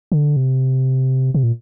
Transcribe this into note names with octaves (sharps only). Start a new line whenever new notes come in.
D3
C3
C3
A#2